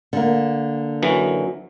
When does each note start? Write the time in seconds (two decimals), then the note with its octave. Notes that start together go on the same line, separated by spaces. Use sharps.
0.13 D3 A#3
1.02 F#2 E3 F#3